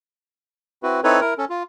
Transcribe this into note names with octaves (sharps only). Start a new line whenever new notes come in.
C4 E4 F#4 B4
C4 D#4 E4 A4 B4 C#5
E4 A#4
C#4 A4
F4